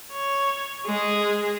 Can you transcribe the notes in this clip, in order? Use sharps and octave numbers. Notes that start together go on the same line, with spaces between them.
C#5
G#3 G#4